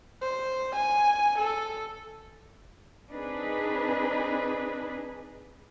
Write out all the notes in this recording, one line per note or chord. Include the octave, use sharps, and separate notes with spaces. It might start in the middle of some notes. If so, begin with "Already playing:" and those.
C5
G#5
A4
C4 D4 D#4 G#4 B4